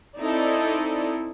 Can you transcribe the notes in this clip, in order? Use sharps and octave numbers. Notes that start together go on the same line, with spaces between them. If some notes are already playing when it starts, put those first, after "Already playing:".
C4 D#4 E4 A4 D5